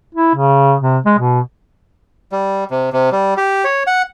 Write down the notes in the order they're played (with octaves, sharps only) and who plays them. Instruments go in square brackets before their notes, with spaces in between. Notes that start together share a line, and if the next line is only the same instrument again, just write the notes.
[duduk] E4
C#3
C3
G#3
B2
[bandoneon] G3
C3
C3
G3
G4
C#5
F#5